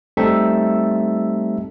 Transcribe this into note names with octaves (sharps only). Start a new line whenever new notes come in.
G3 A3 C4 D#4 A4 E5